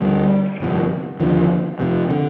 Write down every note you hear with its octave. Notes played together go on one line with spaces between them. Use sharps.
D2 D3 G3
G1 F2 C3
F1 D#2 D3 F3
F1 F2 C3
D3